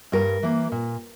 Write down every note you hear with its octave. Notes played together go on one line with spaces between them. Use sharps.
G2 A#4
E3 A#3
A#2